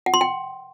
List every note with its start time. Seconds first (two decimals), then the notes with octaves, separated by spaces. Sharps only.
0.06 F#5
0.14 C6
0.21 G5